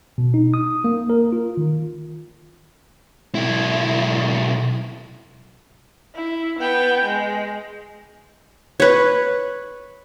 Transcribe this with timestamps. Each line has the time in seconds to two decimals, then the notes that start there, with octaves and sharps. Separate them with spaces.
0.18 B2
0.34 D#4
0.54 D#6
0.84 A#3
1.10 A#4
1.32 F4
1.57 D#3
3.35 B1 E4
6.15 E4
6.59 B3 G5
7.05 G#3
8.80 B4 C#5